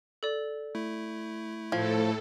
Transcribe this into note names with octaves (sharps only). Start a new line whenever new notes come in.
A4 D5
A3 E4
A2 F3 A4 G#6